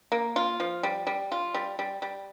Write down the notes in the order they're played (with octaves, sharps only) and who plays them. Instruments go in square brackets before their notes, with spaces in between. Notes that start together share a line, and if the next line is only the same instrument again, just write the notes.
[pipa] A#3
F4
F3
G3
G3
F4
G3
G3
G3